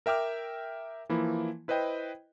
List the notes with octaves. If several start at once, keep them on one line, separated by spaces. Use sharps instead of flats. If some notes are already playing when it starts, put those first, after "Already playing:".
A#4 E5 G5 D6 F6
E3 F3 A#3 E4
E4 B4 C5 D#5 G5